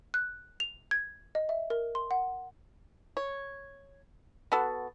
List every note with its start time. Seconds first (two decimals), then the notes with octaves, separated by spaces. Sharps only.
0.14 F#6
0.60 F7
0.91 G#6
1.35 D#5
1.49 E5
1.70 A#4
1.95 C6
2.11 F#5
3.17 C#5
4.52 B3 F#4 A4